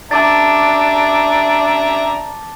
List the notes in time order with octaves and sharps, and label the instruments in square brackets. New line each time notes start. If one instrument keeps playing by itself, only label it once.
[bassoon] D4 [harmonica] E5 A#5 [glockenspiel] A5 D6 A6